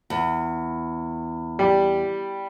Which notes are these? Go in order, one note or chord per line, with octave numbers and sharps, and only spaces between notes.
E2
G3